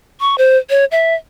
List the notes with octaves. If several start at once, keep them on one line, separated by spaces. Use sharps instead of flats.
C#6
C5
C#5
E5